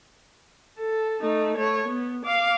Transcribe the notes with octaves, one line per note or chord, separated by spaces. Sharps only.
A4
A3 D#4
A3 C#5
B3
F5 D6